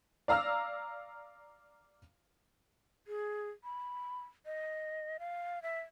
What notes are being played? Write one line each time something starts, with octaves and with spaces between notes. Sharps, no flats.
D5 F5 A#5 E6 F6
G#4
B5
D#5
F5
E5